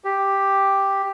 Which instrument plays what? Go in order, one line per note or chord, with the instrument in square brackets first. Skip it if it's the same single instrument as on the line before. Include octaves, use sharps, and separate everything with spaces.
[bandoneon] G4